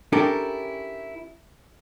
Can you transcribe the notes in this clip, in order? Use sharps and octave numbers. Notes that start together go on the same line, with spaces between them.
C#4 D4 E4 G4 A4 A#4